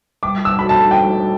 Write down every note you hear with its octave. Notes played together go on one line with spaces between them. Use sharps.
G3 D6
E6
D4 F#4 A4 C#5 B5
A5
G3 G5